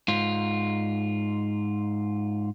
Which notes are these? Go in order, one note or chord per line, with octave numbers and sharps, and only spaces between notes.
G#2 F4